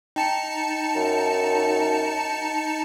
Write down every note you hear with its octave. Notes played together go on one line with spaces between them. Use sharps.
D#4 G5 A5 C#7
F#2